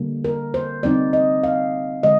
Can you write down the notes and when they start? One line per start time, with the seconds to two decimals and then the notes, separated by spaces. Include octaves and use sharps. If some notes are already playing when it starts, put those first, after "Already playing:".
Already playing: D3 G3 A#3 D4
0.25 A#4
0.54 C5
0.83 D3 G3 C4 D#4 D5
1.13 D#5
1.43 F5
2.03 D3 G#3 D#5